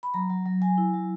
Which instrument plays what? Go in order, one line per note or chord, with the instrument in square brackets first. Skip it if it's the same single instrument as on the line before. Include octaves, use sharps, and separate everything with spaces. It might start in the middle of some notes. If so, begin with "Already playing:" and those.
[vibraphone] B5
F#3 A#5
F#3
F#3
F#3 G#5
E4
F#3